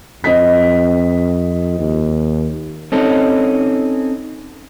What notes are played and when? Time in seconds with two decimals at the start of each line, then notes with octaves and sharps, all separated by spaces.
0.24 F2 C4 D#5 B6
1.79 D#2
2.92 C4 C#4 D#4 A4